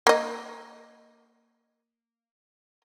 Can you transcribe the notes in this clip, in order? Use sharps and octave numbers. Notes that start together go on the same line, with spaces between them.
A#3 D#5